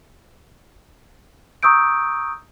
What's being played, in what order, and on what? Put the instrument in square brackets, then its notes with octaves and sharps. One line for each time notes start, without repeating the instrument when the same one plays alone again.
[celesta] A#5 C#6 D#6 E6 G6 D7